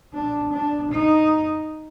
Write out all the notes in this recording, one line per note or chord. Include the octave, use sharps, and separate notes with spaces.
D4
D4
D#4